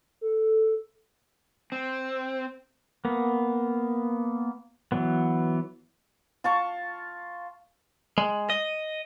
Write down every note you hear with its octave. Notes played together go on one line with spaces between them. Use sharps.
A4
C4
A#3 B3
E3 F#3 B3
F4 A5 C#6
G#3
D#5